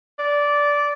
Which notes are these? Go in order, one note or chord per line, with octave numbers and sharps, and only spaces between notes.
D5